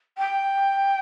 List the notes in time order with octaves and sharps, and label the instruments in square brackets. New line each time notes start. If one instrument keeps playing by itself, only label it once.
[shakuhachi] G5